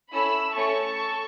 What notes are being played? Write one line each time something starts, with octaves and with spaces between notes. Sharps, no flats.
C#4 E4 A4 B5 E6
A3 C#4 A4 A5 C#6
A4